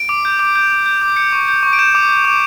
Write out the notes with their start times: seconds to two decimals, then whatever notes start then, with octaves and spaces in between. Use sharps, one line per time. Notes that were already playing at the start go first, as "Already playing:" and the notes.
Already playing: D7
0.09 D6
0.25 G6
0.39 D6
0.56 G6
0.71 D6
0.86 G6
1.02 D6
1.16 G6 C#7
1.32 C#6
1.48 G6
1.63 C#6
1.73 D7
1.79 G6 E7
1.95 D6
2.09 G6
2.25 D6